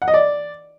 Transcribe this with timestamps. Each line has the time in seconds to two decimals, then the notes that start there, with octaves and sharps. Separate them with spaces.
0.02 F#5
0.08 D#5
0.14 D5